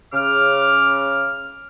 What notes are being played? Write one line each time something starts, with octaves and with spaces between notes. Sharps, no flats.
C#3 D6 F6